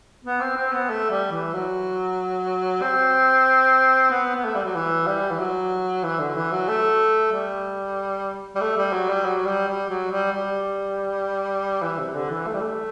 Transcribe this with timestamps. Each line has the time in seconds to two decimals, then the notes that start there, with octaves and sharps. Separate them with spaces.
0.25 B3
0.40 C4
0.56 C4
0.73 B3
0.89 A3
1.10 G3
1.32 E3
1.53 F#3
2.82 C4
4.10 B3
4.35 B3
4.45 A3
4.55 G3
4.65 F#3
4.75 E3
5.07 G3
5.30 E3
5.39 F#3
6.03 E3
6.20 D3
6.36 E3
6.52 F#3
6.68 A3
7.32 G3
8.55 G3
8.61 A3
8.77 G3
8.92 F#3
9.09 G3
9.25 F#3
9.46 G3
9.68 G3
9.89 F#3
10.11 G3
10.32 G3
11.82 E3
11.98 C3
12.14 D3
12.30 E3
12.47 A3
12.53 G3
12.60 A3